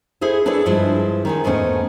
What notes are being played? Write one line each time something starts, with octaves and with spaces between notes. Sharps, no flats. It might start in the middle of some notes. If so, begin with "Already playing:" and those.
E4 G#4 A4 C5
D4 G#4 A4 B4 C#5 D5
G2 F3 G#3 E4
D#3 C#4 G#4
E2 G#2 A3 B3 C#4